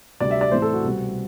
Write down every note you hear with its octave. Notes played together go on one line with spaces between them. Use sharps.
D2 C3 G3 D5
E5
D5
A2 E3 A3 C4 C5
A4
F#4
C2 B2 G3 C4